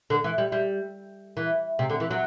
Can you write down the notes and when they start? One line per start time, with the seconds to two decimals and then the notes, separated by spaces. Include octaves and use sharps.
0.10 D3
0.24 E3
0.38 G3
0.52 G3
1.37 E3
1.79 C3
1.90 D3
2.00 E3
2.11 F#3